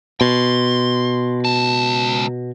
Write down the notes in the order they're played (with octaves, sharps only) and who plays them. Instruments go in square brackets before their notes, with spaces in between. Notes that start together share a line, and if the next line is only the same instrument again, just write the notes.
[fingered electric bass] B2 [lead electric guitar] C6
[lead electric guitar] C#2 A5